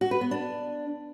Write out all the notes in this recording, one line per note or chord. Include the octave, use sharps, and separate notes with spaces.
F#4
B4
B3
D4